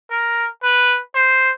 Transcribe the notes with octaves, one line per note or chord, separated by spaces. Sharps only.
A#4
B4
C5